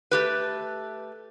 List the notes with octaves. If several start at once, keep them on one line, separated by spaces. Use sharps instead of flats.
A3 G4 B4